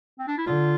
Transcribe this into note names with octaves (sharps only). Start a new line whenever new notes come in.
C4
D4
E4
D3 F4